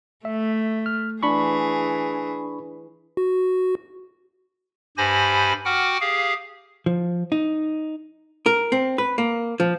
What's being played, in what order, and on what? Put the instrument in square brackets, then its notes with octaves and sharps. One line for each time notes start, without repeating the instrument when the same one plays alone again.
[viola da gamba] A3 [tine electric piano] E5
[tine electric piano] F6
[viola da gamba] E3 G#4 [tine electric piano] D4 B5 C#6
[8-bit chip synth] F#4
[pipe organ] G2 G4 C5 G#5 B5 A#6
F#4 F#5 G5 D6 F6
G4 G#4 F5
[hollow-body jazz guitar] F3
D#4
A#4
C4
B4
A#3
F3